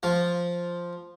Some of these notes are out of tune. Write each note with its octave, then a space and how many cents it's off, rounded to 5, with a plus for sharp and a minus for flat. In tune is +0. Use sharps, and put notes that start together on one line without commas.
F3 +0 F4 +0